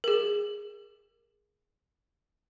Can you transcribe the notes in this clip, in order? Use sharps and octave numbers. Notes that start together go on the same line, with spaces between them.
G#4 A#4